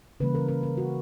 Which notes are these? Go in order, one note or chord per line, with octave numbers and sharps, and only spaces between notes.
C#3 E3 G3 A#3 B4
A#4
A#4
A#4
F#4